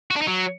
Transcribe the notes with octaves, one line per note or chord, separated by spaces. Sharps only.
F#4
D4
D#4
F#3